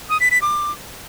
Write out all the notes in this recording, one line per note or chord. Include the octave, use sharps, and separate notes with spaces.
D#6
B6
B6
D6